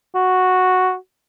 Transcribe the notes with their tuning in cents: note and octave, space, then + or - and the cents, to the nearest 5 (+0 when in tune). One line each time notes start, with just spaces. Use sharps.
F#4 -5